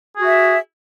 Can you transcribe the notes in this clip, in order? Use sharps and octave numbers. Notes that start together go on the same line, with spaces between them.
F#4 G#4 E5